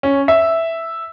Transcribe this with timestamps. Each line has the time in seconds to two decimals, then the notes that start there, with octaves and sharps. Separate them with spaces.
0.03 C#4
0.28 E5